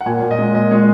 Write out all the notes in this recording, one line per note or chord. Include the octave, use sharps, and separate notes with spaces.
F#5
A#2 G#5
A#2 C#5
D#5
G#3
A#2 D#5
G#3 C#5